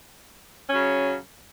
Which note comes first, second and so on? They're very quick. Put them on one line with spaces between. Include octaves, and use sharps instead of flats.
C#4 F#3 C#3